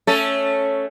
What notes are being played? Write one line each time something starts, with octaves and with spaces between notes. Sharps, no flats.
A3 C#4 A4